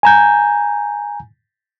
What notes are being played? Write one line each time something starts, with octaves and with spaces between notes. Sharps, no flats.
G#5 A#5 G6